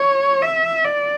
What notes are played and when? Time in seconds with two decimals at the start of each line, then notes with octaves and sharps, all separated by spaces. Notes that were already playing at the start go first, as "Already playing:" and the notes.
Already playing: C#5
0.42 E5
0.85 D5